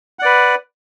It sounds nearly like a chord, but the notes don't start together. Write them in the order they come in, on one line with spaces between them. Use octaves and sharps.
F#5 D5 B4